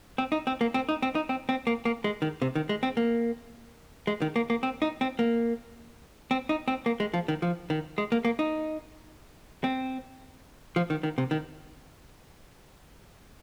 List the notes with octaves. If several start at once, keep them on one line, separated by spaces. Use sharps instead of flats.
C4
D#4
C4
A#3
C4
D#4
C4
D#4
C4
C4
A#3
A#3
G#3
D#3
C3
D#3
G#3
C4
A#3
G#3
D#3
A#3
A#3
C4
D#4
C4
A#3
C4
D#4
C4
A#3
G#3
F3
D#3
F3
D#3
G#3
A#3
A#3
D#4
C4
F3
D#3
D#3
C3
D#3